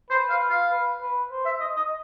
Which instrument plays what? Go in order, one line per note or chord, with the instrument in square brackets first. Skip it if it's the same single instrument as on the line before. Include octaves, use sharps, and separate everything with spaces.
[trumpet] B4 [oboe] C5
[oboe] F5
F5
[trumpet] B4
B4
C5
[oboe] E5
D#5
D#5